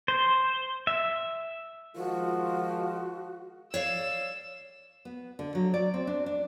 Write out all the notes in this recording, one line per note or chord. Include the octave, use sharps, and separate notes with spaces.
C5
E5
D#3 F3 G#3 F4 F#4
C#5 D5 F5 E6
B3
D3
F#3
D5
C4
D4
D4